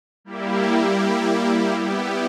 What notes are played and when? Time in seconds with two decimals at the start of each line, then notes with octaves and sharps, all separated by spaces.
0.25 G3 A#3 E4 G4
1.73 G3 B3 E4 G4